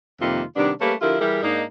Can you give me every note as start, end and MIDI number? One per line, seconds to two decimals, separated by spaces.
0.21 0.43 41
0.21 0.43 48
0.21 0.43 51
0.21 0.43 55
0.21 0.43 58
0.21 0.43 65
0.56 0.72 48
0.56 0.72 51
0.56 0.72 55
0.56 0.72 59
0.56 0.72 62
0.80 0.93 55
0.80 0.93 57
0.80 0.93 58
0.80 0.93 61
0.80 0.93 67
0.80 0.93 71
1.01 1.15 50
1.01 1.15 53
1.01 1.15 64
1.01 1.15 65
1.01 1.15 67
1.01 1.15 70
1.20 1.42 52
1.20 1.42 55
1.20 1.42 64
1.20 1.42 67
1.20 1.42 68
1.20 1.42 70
1.43 1.63 44
1.43 1.63 58
1.43 1.63 62
1.43 1.63 63